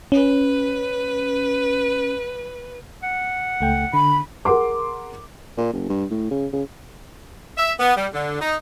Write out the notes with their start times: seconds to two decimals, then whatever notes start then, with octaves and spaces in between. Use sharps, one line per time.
0.12 C#4 B4
3.03 F#5
3.61 C#2 A3 G5
3.94 D3 B5
4.45 G#4 A#4 F#5 C6 D6
5.58 A#2
5.73 F#1
5.89 G2
6.11 A2
6.31 C#3
6.53 C#3
7.57 E5
7.80 B3
7.97 G3
8.13 D3
8.40 D#4